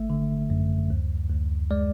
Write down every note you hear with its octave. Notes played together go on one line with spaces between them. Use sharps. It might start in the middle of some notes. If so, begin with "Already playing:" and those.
Already playing: G#1 A3 E5
D3
F#2
D2
D2
G#3 D5